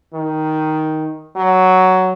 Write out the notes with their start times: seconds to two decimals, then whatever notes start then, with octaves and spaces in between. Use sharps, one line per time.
0.13 D#3
1.36 F#3